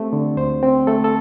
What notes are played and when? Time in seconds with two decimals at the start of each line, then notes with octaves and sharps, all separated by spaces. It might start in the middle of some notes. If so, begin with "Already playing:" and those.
Already playing: A3 C4 G4
0.13 D3
0.37 D2 C5
0.63 C4
0.87 A3 A4
1.04 A4